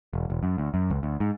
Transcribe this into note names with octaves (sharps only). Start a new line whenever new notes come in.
E1
E1
F#2
D2
F#2
C#2
D2
G#2